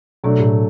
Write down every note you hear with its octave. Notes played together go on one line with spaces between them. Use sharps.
B2 F#3 A3 D4
A2